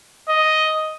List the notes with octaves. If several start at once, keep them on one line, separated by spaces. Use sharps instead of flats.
D#5